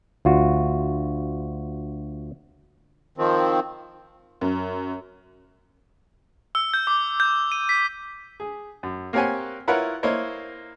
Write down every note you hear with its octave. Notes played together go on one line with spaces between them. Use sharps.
D2 F4 F#4
D#3 F3 C4
F#2
E6
G6
D6
G6
D#7
B6
G#4
F#2
A#3 C4 G4 C#5 F#5 G#5
E4 F4 A#4 B4 C#5 F#5
A#3 E4 C5 C#5 D#5